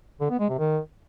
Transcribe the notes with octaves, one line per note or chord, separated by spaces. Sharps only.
D3
B3
G#3
C3
D#3